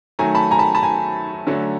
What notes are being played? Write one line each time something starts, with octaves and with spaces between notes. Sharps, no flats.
D#3 F#3 A3 G#5 A#5
A5 B5
G#5 A#5
A5 B5
A5 B5
G#5 A#5
D3 F#3 A3